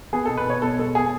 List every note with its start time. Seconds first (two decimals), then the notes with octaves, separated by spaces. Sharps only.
0.13 B3 G#4
0.25 B2 A4
0.37 B4
0.46 B3 C#5
0.62 B2 A4
0.78 G#3 A4
0.95 B3 G#4